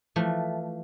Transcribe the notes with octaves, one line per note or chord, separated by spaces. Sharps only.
E3 F3 A3